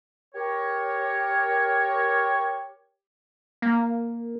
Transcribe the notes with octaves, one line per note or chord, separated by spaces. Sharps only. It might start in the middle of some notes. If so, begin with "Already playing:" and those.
G4 A#4 C#5
A#3